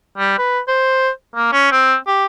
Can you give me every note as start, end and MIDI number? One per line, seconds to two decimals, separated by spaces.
0.17 0.36 55
0.38 0.60 71
0.68 1.09 72
1.36 1.51 58
1.53 1.70 61
1.72 1.96 60
2.07 2.26 67